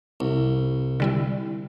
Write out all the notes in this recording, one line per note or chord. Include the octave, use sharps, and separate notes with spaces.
C2
D3 G3 E4